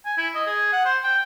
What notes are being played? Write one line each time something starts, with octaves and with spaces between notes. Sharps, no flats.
G#5
E4
D#5
G#4
F#5
C5
G5